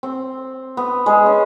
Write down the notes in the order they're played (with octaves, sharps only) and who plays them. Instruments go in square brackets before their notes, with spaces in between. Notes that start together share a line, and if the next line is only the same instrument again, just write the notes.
[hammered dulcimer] C4
B3
G#3
C#4